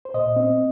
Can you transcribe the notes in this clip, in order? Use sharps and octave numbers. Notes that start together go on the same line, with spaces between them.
C5
A#2 D#5
C4